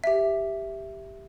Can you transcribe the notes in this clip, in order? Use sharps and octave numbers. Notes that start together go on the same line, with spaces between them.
G4 E5